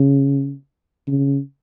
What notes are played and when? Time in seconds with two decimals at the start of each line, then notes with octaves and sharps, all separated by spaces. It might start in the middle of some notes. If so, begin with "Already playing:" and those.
Already playing: C#3
1.07 C#3